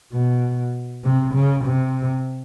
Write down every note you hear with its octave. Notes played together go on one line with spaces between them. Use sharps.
B2
C3
C#3
C3